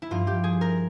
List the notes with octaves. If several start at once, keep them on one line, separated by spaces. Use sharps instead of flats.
E4
G2 F3 F4
G4
G#4
A#4